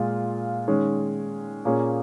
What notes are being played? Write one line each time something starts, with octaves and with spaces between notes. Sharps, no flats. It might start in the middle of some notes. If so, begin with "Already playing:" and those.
Already playing: A#2 G#3 F4
D#3 G#3 C#4
A#2 A#3 C#4 G#4